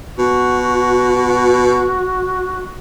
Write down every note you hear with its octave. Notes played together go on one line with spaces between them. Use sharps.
B2 F#4